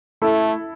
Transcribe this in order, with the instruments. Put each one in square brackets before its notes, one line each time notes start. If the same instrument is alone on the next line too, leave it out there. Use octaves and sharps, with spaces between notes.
[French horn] A3 [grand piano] E4 A4